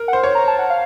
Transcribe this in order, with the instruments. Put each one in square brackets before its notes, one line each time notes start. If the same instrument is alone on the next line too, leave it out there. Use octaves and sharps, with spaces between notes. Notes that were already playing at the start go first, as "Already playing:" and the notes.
Already playing: [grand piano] A#4
[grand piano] C5 [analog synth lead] F#5
[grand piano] C#5
[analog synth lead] A#5
A5
F#5
F5